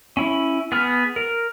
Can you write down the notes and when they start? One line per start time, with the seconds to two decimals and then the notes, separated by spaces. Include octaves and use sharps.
0.17 C#4 E4
0.72 B3 G#4 F6
1.16 A#4